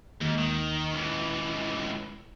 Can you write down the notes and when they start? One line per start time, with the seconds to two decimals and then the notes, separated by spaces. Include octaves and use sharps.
0.21 D#2 G#2
0.39 D#3
0.93 C#2 E3